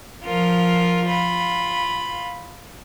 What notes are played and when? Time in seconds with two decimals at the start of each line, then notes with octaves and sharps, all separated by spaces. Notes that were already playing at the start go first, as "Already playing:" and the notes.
0.25 F3 F4 A#4
1.07 F4 B5